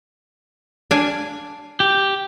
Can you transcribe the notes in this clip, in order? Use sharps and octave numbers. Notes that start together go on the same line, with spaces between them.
D4 F5 G#5
G4